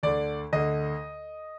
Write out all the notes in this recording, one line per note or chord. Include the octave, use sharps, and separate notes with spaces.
D2 D3 D5
D2 D3 D#5